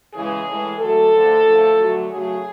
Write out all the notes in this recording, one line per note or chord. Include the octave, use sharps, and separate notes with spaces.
C#3 E3 G#3 G#4
A2 E3 G#3
D3 F#3 A3 A4
D3 F3 A3
D3 F3 A3
D3 F#3 A3
C#3 F#3 A3 G#4